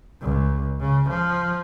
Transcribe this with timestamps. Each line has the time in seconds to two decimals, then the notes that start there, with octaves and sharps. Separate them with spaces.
0.21 C#2
0.80 C#3
1.09 F3